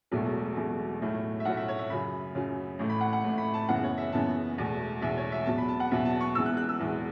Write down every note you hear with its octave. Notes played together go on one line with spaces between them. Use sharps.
E1 E2 B2 F#3 A3
E1 E2 B2 F#3 A3
B1 A2 F#3 A3
E5
B1 A2 F#3 A3 F#5
E5
C#5
E5
F#2 C#3 F#3 B5
F#2 C#3 F#3
A1 A2 A3
B5
F#5
F#5
A1 A2 A3
B5
A5
F#1 F#2 C#3 E3 B3 F#5
C#5
E5
F#1 F#2 C#3 E3 B3 A5
E1 E2 B2 A3
E1 E2 B2 A3 E5
C#5
E5
E2 B2 F#3 B3 A5
B5
A5
F#5
E2 B2 F#3 B3 E5
A5
C#6
E1 E2 E3 B3 E6
F#6
F#6
E6
E1 E2 E3 B3